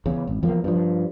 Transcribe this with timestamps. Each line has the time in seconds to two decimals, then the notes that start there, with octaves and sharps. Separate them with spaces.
0.06 E2 C#3
0.27 G#1
0.43 E2 F3 A#3
0.64 G2 F3